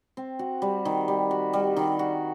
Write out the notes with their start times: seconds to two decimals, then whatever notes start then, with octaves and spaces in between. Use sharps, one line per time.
0.17 C4
0.39 F#4
0.62 G3
0.85 D#3
1.08 G3
1.31 F#4
1.53 G3
1.76 D#3
1.99 F#4